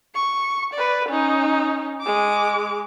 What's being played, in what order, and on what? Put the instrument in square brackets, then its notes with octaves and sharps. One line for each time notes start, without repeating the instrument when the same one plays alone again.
[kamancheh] C#6
B4 D5
C#4 D#4
G#3 D6